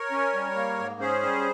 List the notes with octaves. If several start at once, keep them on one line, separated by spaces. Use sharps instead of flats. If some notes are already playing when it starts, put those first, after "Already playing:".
Already playing: A#4 C#5
C#4
G3
A#3
G#2
C#4 G#4 C5
G3